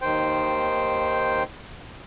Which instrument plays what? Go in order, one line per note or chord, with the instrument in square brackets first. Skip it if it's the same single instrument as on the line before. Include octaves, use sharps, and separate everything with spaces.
[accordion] D#2 D#3 C5 G5